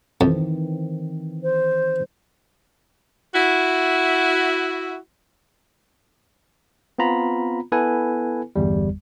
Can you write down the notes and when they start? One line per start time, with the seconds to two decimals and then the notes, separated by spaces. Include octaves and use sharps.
0.21 F2 D#3 E3 C4
1.43 C5
3.34 E4 F#4
6.98 B3 C4 F4 A#5 B5
7.72 B3 E4 A4 B4 G#5
8.56 G1 E2 G3